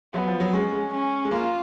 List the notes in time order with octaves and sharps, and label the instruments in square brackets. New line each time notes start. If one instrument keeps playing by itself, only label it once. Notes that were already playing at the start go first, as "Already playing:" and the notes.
[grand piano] F#3 [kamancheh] B3
[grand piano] F3
F#3
[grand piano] G#3 [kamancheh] C#4
[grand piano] G#3
[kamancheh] C#4
[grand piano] G#3
[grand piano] A#3 [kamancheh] F4